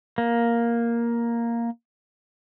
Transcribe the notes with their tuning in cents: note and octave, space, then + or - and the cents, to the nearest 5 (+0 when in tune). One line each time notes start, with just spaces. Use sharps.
A#3 +5